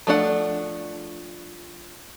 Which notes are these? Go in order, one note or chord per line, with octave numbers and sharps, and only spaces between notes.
F3 A3 D4 G#4 F#5